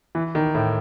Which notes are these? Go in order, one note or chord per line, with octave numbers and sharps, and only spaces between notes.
E3
D#3
A2